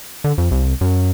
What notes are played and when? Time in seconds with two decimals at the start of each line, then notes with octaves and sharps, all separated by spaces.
0.24 D3
0.38 F2
0.51 C2
0.81 F#2